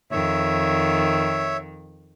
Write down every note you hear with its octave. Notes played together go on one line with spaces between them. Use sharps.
F2 D#3 C#5 E5